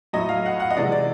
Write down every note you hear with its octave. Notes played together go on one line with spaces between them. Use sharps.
A2 F#3 A3 D#5
F5
F#5
F#5
D#5
C3 E3 G#3 D5
D5